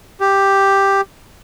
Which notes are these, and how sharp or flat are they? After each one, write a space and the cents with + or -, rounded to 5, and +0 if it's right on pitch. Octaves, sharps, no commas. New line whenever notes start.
G4 +5